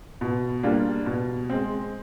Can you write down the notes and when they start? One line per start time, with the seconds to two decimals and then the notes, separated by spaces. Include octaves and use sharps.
0.21 B2
0.63 G3 A#3 D4 F4
1.06 B2
1.50 G#3 C4